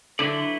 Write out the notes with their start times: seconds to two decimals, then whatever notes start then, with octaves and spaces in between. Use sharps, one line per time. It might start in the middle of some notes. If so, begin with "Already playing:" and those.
0.19 D3 F#3 A3 E4 B4 D5